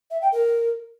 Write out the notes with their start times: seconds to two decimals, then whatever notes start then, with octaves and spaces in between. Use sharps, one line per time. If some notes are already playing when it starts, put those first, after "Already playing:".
0.10 E5
0.21 G5
0.32 A#4